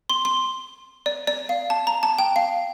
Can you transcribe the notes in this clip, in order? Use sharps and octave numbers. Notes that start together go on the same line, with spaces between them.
C6
C6
D5
D5
F5
A5
A#5
A5
G5
F5